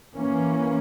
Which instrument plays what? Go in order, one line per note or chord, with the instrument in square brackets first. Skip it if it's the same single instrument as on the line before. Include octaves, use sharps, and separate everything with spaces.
[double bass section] E3 A#3 C#4